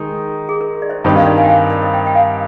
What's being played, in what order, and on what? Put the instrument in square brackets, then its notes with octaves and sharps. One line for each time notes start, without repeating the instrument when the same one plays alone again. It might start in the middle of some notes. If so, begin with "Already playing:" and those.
Already playing: [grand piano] D#3 G#3 D#4
[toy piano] G#4
A#4
D5
C5 D#5
[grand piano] G2 D#3 G3 C4 D#4 [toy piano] C5 D#5
[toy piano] D5 F5
A#4 D5
F5 G#5
G5
F5 G#5
A#4 D5
C5 D#5
D#5 G5
G5
F5 G#5